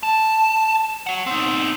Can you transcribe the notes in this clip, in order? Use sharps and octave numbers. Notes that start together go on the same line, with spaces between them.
A5
C#5 F#5
C4 D#4